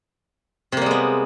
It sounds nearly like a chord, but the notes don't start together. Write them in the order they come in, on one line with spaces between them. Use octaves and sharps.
C3 A#3 G3 G#3 B3